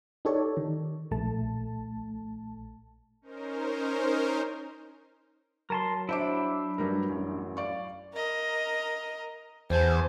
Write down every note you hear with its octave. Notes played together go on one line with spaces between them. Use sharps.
D#4 G4 A4 C#5 D5
D#3
A#1 A3 A5
C#4 D#4 A#4 C5
F#3 A#4 A5 C6
D4 E4 C5 E5 D6
G2 F#3 G3 A#4
A1 F#2
D5 F5 C#6
A#4 D#5
E2 C5 G#5 A5